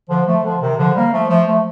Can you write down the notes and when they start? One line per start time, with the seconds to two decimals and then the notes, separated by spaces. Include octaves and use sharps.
0.10 D3 F3
0.26 F3 A3
0.44 D3 F3
0.61 C3 D#3
0.78 D3 F3
0.95 G3 A#3
1.12 F3 A3
1.30 F3 A3
1.46 F3 A3